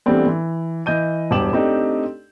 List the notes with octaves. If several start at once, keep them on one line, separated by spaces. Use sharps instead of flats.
E3 G3 A3 B3 C4 D4
E3
E3 D#5 G6 D#7
E1 G2 G4 D6 E7 F#7
A3 C4 D4 D#4 G4